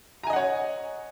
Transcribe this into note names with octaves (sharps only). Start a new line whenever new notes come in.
C#5 D#5 F#5 G#5 A#5